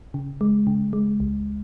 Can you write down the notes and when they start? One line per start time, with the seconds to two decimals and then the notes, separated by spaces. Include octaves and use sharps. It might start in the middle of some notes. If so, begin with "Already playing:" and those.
0.14 C#3
0.41 G#3
0.67 C#3
0.93 G#3
1.20 C#2